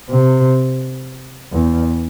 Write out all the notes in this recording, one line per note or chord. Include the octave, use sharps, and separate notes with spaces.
C3
E2